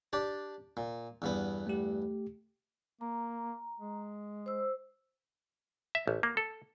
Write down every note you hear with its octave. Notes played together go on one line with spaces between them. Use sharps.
D4 G4 D5
A#2
E2 G2 B3
A3 G4
A#3 A#5
G#3
C5 E6
E5
A1
A#3
A4